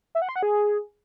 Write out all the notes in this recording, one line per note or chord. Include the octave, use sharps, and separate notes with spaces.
E5
F#5
C6
F#5
G#4